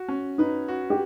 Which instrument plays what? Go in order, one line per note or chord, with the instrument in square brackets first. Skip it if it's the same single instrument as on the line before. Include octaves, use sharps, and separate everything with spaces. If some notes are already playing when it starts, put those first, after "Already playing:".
Already playing: [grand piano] F#4
C#4
[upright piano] D#4 [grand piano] B4
[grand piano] F#4
[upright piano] G4